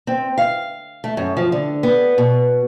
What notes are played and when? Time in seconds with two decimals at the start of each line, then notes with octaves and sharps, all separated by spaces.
0.07 C4
0.38 F5
1.04 A3
1.17 F#2
1.37 F3
1.52 D3
1.83 B3
2.18 B2